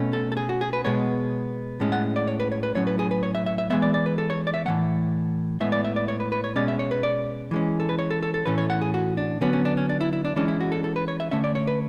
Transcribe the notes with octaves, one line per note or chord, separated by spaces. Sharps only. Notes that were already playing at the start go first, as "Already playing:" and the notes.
Already playing: B2 A3 C#4
A4
A4
G#4
F#4
G#4
B4
B2 G#3 B3 C#5
A2 G#3 C#4
F#5
D5
C#5
B4
C#5
B4
A2 F#3 C#4 C#5
B4
G#4
B4
C#5
E5
E5
E5
E3 G#3 B3 E5
D5
D5
B4
A4
C#5
D5
E5
A2 E3 A3 F#5
A2 G#3 B3 E5
D5
E5
D5
C#5
B4
B4
C#5
B2 G#3 C#4 D5
E5
C#5
B4
D5
E3 G#3 C#4
A4
B4
C#5
A4
A4
A4
A2 E3 A3 C#4 B4
C#5
F#5
G#4
F#4
D4
D3 F#3 B3 C#4
C#4
D4
C#4
D4
E4
E4
D4
E3 G#3 C#4 D4
E4
F#4
A4
A4
B4
C#5
E5
D3 A3 C#4 E5
D5
C#5
B4